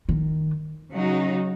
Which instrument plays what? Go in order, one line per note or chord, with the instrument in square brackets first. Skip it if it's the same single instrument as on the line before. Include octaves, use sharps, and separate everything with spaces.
[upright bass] D#3
[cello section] C#3 F#3 D#4 F#4